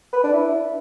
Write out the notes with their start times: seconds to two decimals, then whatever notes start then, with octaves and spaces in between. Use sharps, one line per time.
0.13 B4
0.23 D4
0.34 E4